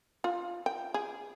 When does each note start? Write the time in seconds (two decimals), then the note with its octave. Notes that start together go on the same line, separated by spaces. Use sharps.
0.24 F4
0.66 G5
0.94 G#4